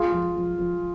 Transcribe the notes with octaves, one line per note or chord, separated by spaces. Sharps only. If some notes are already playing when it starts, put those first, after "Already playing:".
Already playing: G#3 F4 G#4
F3
F3
F3